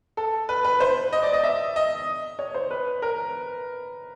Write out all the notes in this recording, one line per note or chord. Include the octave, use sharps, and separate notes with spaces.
A4
B4
B4
C5
D#5
D5
D#5
E5
D#5
C#5
C5
B4
A#4